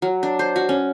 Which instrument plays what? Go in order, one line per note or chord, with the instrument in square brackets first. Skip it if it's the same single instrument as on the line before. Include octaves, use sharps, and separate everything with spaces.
[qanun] F#3
D4
C5
F#4
C#4